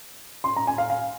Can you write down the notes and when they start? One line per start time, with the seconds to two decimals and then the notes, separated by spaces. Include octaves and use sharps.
0.44 C6
0.56 A#5
0.67 G#5
0.78 F5
0.90 F5